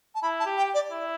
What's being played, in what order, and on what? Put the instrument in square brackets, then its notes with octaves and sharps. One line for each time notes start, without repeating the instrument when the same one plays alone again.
[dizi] A5
[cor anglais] E4 [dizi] B5
[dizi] A5
[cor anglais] G4
[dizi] G5
D5
[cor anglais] E4